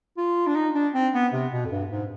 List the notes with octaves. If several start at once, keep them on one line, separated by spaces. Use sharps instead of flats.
F4
D4
D#4
D4
C4
B3
C3
B2
F2
G2
G#2